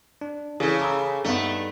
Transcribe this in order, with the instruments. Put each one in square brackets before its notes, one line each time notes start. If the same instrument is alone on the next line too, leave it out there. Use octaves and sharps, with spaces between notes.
[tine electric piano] D4
[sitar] C#3 A4 [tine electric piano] E3 [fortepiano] G#4
[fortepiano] A#5 E6 [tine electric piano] B5 D6
[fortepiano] G2 B3 [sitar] A3 [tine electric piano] D#4